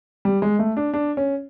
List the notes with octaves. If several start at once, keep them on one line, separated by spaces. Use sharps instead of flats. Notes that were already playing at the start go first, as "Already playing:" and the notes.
G3
G#3
A3
D4
D4
C#4